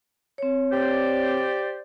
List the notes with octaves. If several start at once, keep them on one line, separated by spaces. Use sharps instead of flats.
C4 C#5
G4 C5 D5